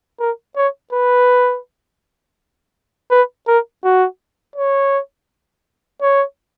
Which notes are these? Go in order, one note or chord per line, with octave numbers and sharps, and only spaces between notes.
A#4
C#5
B4
B4
A#4
F#4
C#5
C#5